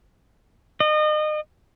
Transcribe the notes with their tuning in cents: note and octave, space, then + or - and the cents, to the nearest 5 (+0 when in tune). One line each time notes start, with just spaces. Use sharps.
D#5 -30